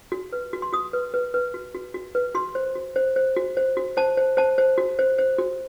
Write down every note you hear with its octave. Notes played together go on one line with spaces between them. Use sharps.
F#4
B4
F#4
C6
F#4 D#6
B4
B4
B4
F#4
F#4
F#4
B4
F#4 C6
C5
F#4
C5
C5
F#4
C5
F#4
C5 A5
C5
C5 A5
C5
F#4
C5
C5
F#4